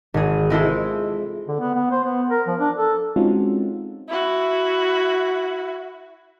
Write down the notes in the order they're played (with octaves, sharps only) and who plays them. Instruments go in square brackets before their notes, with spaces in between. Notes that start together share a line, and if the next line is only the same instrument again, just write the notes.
[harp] G#1 G#4
G#3 C4 E4 F4 A4 C5
[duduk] D3
B3
B3
C5
B3
A#4
F3
D4
A4
[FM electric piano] G#3 C4 C#4 D#4 F4 F#4
[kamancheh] E4 F#4